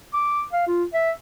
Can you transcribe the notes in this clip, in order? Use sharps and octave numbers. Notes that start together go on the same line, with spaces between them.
D6
F5
F4
E5